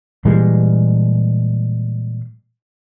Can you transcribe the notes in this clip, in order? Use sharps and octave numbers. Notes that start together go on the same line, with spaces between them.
A#2 E3 G3 G#3